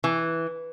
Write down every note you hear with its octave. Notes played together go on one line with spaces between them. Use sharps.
E3